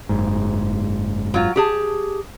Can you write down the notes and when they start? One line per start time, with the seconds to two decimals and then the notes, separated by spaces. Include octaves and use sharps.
0.09 F#1 G#2
1.34 F#3 F4
1.56 G4 G#4 A5